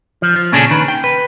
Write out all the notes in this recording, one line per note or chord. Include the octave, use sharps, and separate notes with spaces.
F3
F3
A#2 C#3 C#4 D4 G#4 A4
D#3 B4
G5
B4